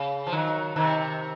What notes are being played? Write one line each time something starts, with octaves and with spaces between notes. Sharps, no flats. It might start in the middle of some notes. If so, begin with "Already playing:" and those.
Already playing: C#3
F3
D#3 F#3
C3 D#3